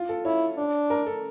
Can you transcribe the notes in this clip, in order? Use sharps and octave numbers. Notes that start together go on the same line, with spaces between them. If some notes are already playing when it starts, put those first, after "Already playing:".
Already playing: F4
A4
E4 C#5
D4
A#4
A4